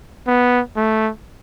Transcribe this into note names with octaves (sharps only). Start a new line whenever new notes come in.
B3
A3